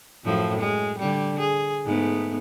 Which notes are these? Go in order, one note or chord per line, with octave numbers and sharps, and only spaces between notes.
F#2 A2 F3
G#3
D3 G3
G#4
G#2 A3 B3